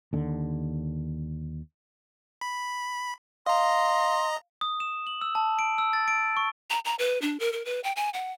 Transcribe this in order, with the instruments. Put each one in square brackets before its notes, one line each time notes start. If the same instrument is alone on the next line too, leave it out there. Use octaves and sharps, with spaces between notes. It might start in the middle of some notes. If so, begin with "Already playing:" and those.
[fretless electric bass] D#2 D3
[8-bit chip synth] B5
[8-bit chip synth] D#5 A#5 [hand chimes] F5 [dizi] C6
[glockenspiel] D#6
E7
F#7
E6
A5
D7
E6
A6
D7
C#6
[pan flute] A#5
A#5
B4
D4
A#4
A#4
B4
G5
G#5
F#5